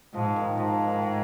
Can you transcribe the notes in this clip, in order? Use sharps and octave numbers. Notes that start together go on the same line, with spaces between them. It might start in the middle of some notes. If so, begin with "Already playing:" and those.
G#2 F3
D#3
G#2 F3
D#3